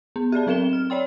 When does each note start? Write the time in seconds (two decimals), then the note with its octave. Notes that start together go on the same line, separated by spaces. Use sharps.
0.16 B3
0.32 G4 G#4 D5 A5
0.47 F#3 C4 A#4 D#5 E7 G7
0.73 F6
0.90 C#5 D5 G5 C6